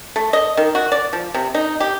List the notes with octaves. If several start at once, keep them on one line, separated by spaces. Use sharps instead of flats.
A3
D#5
D#3
F#4
D5
F3
C3
D#4
G4